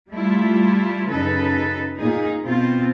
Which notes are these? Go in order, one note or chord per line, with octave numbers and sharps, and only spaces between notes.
G3 A3 E4 F4
F#2 C#3 D#4 A4 B4
A#2 D#4 G#4
B2 C4 F4